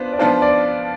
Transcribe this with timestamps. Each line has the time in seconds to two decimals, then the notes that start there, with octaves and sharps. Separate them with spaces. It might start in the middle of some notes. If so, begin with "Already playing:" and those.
Already playing: B3 D4 F4 B4 C5
0.13 D5
0.19 F3 B3 D4 F4 C5
0.42 D5